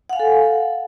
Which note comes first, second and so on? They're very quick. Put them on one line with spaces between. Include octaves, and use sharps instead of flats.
F#5 F5 G#5 A4